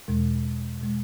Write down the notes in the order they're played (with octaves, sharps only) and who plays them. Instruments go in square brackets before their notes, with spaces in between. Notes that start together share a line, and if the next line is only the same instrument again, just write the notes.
[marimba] E2 B2 G#3
B2 G#3